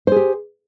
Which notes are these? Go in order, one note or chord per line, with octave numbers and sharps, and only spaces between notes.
G4 G#4 C5